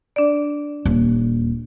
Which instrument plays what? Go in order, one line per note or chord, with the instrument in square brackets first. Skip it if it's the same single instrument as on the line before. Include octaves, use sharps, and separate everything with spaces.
[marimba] D4 D5
[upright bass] D#1